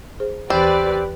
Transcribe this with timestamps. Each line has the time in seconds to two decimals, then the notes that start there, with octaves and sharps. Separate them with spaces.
0.20 G#4 C5
0.50 D#2 E3 C4 G4 B4 D5